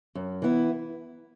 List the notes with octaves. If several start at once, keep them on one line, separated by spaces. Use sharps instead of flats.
F#2
E3 B3 E4